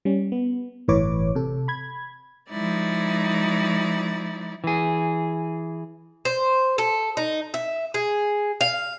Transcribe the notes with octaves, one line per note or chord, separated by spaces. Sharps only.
G3 C#4
B3
G1 A2 E3 B4 C#5 D6
C3 A4
B5 G#6
F3 G#3 D#4 E4 D5
E3 G#4
C5
A4
D#4
E5
G#4
F5